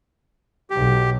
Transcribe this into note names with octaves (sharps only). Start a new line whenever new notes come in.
B1 F#3 G4